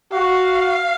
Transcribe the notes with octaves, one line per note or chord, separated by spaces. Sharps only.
F#4 F5